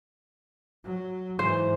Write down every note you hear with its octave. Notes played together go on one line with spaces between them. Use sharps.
F#3
G#2 E3 C5